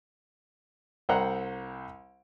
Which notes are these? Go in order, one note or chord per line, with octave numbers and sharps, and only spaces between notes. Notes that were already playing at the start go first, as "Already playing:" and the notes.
C2 C5 F#5 G5 A#5 F#6